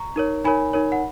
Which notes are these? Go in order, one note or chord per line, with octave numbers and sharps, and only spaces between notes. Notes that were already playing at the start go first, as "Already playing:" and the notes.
Already playing: A#5 C#6
D#4 A#4 C#5
D#4 A#4 C#5 G#5 B5
D#4 A#4 C#5
F#5